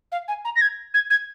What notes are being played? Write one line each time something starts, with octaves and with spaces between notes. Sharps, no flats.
F5
G#5
A#5
A#6
G#6
G#6
G#6